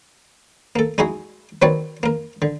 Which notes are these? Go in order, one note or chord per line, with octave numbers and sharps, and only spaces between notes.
A#3 A4
G#3 D#4 E4 F#4 G#4
D#3 F#3 C4 B4 C#5 D5
A#3 A#4
D3